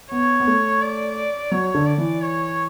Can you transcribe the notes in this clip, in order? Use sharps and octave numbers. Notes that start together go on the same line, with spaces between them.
B3 C#5
B3
A3
D5
F#3 C#5
D3
D5
E3
C#5